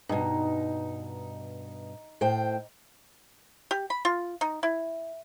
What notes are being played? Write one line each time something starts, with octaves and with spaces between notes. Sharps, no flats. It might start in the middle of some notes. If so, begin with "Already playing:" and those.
G2 B2 D#4
A2 C5 G5
G4
B5
F4
D#4
E4